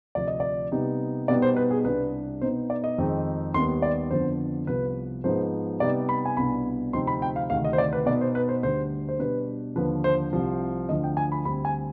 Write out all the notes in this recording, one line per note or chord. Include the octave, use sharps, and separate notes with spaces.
D2 C3 F3 D5
D#5
D5
C3 G3 B3 D#4
B2 G3 B3 D#4 D5
C5
B4
G#4
C2 C3 G3 D4 B4
B2 B3 D#4 C5
D5
D#5
F2 D#3 G#3 C4 D#4
D#2 D#3 G3 B3 C6
D5
F2 D3 F3 B3 C5
C2 C3 F3 B3 B4
G#2 F3 B3 D#4 C5
C3 G3 B3 D#4 D5
B5
G#5
C2 B2 B3 D4 B5
D2 C3 F3 C4 D#4 C6
B5
G5
F5
D2 C3 D#3 F5
D#5
C5
D5
B4
B2 B3 D#4 D5
C5
B4
C5
D2 D3 G3 C5
C5
B2 G3 D4 B4
D#2 D3 F3 B4
C5
C2 C3 F3
D2 D3 F3 D#5
G5
G#5
B5
D2 D3 G3 C4 B5
G#5